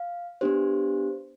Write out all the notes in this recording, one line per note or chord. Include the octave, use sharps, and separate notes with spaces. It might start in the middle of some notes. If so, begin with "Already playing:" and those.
Already playing: F5
B3 D4 G4 C5